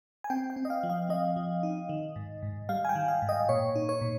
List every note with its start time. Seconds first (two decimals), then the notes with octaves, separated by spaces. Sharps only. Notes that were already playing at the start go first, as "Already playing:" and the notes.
0.24 G#5
0.30 C4 G5
0.50 G5
0.56 C4
0.65 D#5
0.70 F5
0.83 F3
0.90 F5
1.09 F3 D#5
1.36 F3
1.63 D#4
1.89 D#3
2.16 G#2
2.43 G#2
2.69 G3 F5
2.85 G#5
2.89 G5
2.95 D#3
3.08 F5
3.22 G#2
3.29 D#5
3.49 A#2 C#5
3.75 D#4
3.89 C#5
4.01 A#2